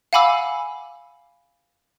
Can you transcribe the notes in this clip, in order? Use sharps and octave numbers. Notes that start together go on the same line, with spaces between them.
F5 F#5 G#5 B5 D6 E6